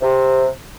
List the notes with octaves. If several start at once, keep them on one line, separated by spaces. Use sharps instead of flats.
C3